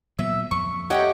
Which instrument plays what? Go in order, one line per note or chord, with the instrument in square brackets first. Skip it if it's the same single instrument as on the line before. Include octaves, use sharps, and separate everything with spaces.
[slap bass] A#2 F#3 B3 [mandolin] E5
[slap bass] F2 [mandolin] C#6
[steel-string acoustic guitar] G4 D#5 F#5 [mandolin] C#5 G5 A#5